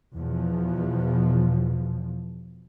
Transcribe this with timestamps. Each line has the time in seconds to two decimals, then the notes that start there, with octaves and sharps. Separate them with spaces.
0.13 E2 B2 F3